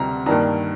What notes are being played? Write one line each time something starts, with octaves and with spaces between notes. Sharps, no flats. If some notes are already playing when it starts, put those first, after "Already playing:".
Already playing: D2 C3 G3 A#5
G2 D#3 A#3 D4 A#5